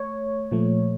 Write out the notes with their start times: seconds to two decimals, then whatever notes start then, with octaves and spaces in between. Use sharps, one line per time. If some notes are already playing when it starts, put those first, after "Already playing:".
Already playing: A3 C#5
0.51 A#2 F3 A3